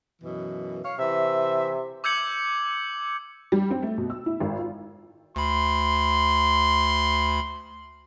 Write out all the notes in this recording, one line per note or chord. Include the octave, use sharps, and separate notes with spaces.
F#2 B2 E3
C#5 F5
C3 E3 E5
D6 E6 G6 G#6 C#7 F#7
G3
C4
A3
B2
E6
E4
G#1
F4
D2 B5 C6